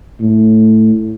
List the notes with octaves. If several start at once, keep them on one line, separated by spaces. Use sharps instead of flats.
A2